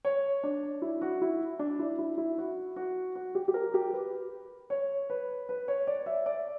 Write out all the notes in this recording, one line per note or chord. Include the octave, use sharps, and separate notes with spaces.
C#5
D4
E4
F#4
E4
D4
E4
E4
E4
F#4
F#4
F#4
G4
G4
A#4
G4
B4
C#5
B4
B4
C#5
D5
E5
D5